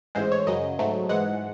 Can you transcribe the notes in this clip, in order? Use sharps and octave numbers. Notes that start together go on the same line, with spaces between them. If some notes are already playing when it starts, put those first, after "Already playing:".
A1 G#2 E3 G#3 C5
C#5
F#2 C#3 F#3 D#5
G#2 F#3 A3
G#2 E3 G#3 F#5